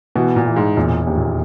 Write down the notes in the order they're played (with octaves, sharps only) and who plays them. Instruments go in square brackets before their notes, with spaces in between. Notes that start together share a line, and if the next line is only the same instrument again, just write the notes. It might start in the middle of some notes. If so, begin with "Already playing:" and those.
[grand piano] B2 [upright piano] E3
[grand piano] A#2
[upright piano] E3
[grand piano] G#2
[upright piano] E1 [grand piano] A#2
[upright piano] D#2
[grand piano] A#2